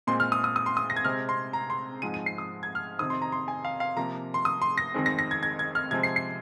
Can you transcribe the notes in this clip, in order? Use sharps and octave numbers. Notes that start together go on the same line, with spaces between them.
A#2 G#3 C4 C6
F6
D#6
D#6
D#6
C6
D#6
A#6
G#6
C3 G#3 C4 F6
C6
A#5
C6
G#2 F3 G#3 C4 D#7
D#7
C7
D#6
G#6
F6
F2 C3 D#3 C4 D#6
C6
A#5
C6
G#5
F5
F5
C3 F3 A#3 A#5
C6
D#6
C6
A#6
F2 D#3 G#3 C4
A#6
A#6
G#6
G#6
G#6
F6
C3 F3 G#3 C4 G#6
C7
C7